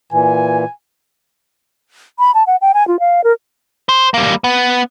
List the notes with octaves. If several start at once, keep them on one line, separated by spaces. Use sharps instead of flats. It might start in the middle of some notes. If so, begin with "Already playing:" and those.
A#2 E3 G#5
B5
A5
F#5
G5
G#5
F4
F5
A#4
C5
G3 A#3
B3